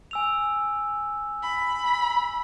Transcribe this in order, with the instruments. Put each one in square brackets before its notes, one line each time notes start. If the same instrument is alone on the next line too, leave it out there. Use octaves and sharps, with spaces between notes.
[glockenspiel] G#5 E6 F7
[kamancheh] B5